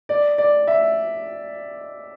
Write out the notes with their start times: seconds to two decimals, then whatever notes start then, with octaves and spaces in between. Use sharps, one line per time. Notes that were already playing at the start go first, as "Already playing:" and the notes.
0.09 D5
0.38 D5
0.67 E5